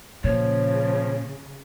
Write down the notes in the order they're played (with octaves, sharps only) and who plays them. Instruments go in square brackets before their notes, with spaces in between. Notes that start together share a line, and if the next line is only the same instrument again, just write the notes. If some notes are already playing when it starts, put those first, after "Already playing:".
[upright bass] A#2 [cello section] C#3 [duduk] F3 [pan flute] C#5